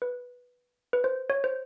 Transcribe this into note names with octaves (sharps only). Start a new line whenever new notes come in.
B4
B4
C5
C#5
C5